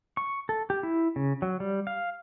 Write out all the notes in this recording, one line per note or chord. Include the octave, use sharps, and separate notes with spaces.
C#6
A4
G4
E4
C#3
F#3
G3
F5